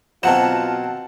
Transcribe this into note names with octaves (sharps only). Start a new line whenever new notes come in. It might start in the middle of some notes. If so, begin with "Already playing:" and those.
B2 F#3 C4 F4 F#5 G5 A5 E7